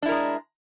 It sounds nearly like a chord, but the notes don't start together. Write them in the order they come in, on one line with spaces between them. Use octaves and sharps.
D4 E4 A#4 G#3